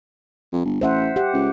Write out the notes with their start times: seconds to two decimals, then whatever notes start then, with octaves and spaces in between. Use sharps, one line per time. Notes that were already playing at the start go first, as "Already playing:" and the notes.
0.53 F2
0.65 G1
0.81 A1 C5 E5 F#5
1.16 G4 F#5
1.34 C#2